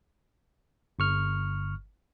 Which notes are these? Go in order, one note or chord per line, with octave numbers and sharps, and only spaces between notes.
G1 C#6 F6